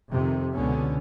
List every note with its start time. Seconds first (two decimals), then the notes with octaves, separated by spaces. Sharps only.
0.10 F2 C3 D#3
0.53 C#2 B2 D3 B3 C#4